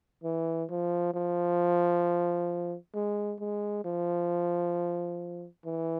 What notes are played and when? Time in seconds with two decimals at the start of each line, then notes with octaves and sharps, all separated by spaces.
0.24 E3
0.70 F3
1.14 F3
2.94 G#3
3.40 G#3
3.85 F3
5.65 E3